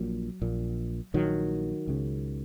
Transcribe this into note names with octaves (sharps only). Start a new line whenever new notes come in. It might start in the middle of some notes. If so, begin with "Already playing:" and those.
Already playing: A#1 A#2 F#3
A#1 A#2
A#1 A#2 D#3 F#3
C#2 C#3